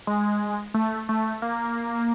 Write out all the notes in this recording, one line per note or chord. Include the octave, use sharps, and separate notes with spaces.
G#3
A3
A3
A#3